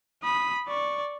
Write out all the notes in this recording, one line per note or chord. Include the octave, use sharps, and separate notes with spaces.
B5 D#6
D5 C#6